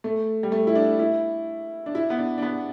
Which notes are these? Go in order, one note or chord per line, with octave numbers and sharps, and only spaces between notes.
A3
G3
A3
E4
D4
E4
D4
E4
B3
D4
D4
B3